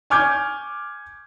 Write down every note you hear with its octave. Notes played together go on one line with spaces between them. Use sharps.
G#5 C#6 D6 F6 G6 G#6